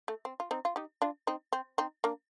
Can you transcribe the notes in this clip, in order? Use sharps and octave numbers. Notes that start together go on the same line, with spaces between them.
A3
C4
F4
C4 D#4
F4
D#4 G4
D4 F4
C4 D#4
C4
C4 D#4
A#3 D4